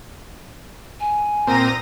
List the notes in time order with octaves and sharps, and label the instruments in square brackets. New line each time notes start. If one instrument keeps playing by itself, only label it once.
[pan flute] G#5
[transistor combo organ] A#2 C4 [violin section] A#5 D#6 A#6